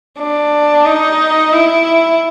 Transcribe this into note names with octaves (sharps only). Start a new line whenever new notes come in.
D4
D#4
E4